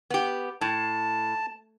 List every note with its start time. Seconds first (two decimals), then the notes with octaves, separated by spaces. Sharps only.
0.10 B3 G4
0.61 A2 A5